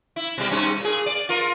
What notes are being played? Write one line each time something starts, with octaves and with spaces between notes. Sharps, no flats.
E4
B2 G3 G4
G2 C#4
A#2 G#4
D5
F4 A#4